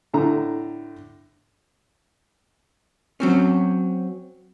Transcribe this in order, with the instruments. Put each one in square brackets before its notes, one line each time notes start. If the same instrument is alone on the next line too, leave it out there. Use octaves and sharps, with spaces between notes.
[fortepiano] A2 D3 A#5
[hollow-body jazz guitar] F#3 C4 C#4